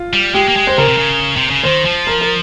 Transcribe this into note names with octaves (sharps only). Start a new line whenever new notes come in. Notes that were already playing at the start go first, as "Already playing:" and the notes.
Already playing: F4
G3
G#3 G4
A#3
G#3
C5
C#3 A#4
C3
C#3
C3
C#3
D#3 C5
F3
A#4
A#4